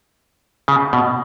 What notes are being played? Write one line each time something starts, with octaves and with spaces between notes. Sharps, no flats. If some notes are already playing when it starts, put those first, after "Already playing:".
C#3
B2